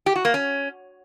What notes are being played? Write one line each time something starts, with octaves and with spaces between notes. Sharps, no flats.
G4
F#4
A#3
C#4